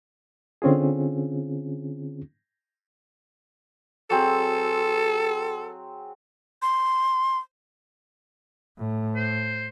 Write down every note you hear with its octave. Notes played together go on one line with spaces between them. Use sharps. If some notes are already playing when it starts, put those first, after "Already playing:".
D3 C4 C#4 F4 G#4
F#3 C4 G#4 A4
C6
A2
C5